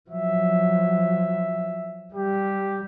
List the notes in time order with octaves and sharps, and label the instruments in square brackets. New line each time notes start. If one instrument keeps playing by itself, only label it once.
[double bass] F3 F#3 [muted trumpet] E5
[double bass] G3 [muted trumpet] G4